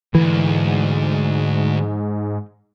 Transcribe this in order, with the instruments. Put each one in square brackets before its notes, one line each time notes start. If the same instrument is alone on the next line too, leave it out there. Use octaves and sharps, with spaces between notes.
[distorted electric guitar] D2 [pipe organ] G#2 [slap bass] E3